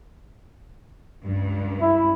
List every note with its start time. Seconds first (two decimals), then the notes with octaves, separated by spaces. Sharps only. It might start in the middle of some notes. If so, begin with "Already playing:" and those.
1.23 C#2 G2
1.80 E4